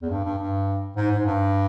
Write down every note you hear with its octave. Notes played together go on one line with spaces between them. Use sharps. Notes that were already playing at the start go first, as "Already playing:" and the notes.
E2
G2
G2
G2
G#2
G#2
G2